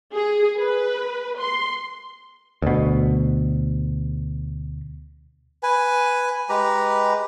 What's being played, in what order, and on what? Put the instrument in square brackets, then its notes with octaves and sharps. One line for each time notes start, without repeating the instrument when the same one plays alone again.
[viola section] G#4
B4
C6
[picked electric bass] D2 B2
[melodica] B4 G#5
G#3 G4 B4 A#5